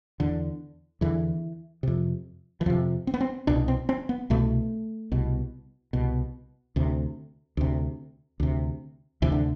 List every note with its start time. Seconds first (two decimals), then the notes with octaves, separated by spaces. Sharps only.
0.20 E2 D3
1.01 E2 D3 E3
1.83 F2 C3
2.61 E3
2.66 F2 C3 F3
3.07 C4
3.14 B3
3.21 C4
3.47 C2 B2 D4
3.68 C4
3.89 C4
4.09 B3
4.30 C2 B2 A3
5.12 C2 B2
5.93 C2 B2
6.76 D2 C3
7.57 D2 C3
8.40 D2 C3
9.22 D2 C3 E3
9.32 D3